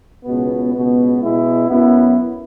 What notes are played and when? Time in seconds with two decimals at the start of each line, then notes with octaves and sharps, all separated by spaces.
0.24 C#2 B2 B3
0.72 C#2 B2 B3
1.20 B2 G#3 E4
1.68 F#2 F#3 B3 E4